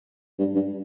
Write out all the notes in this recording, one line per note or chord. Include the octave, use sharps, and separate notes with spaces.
G2
G2